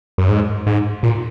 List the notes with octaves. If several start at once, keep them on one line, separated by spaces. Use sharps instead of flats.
F#2
G#2
G#2
A#2